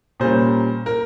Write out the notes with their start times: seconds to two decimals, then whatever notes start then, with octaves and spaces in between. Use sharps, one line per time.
0.20 A#2 G3 A#3 C#4 C5
0.86 A#4